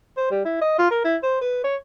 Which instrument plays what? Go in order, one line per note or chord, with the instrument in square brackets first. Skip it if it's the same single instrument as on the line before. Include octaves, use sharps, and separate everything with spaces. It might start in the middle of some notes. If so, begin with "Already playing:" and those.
[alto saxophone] C5
G3
E4
D#5
F4
A#4
E4
C5
B4
C#5